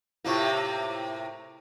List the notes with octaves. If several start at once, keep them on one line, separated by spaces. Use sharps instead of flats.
A2 C3 A#3 E4 F4 C#6